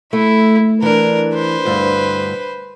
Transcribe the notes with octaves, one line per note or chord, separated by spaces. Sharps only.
A3 E4
E3 D4 A#4
B4 C5
D2 G2